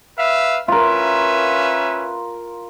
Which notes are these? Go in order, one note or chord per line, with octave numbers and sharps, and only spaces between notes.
B4 E5 F5
C#4 F4 A#4 B4 E5